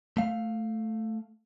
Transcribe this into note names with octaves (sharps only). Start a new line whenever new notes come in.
A3 F5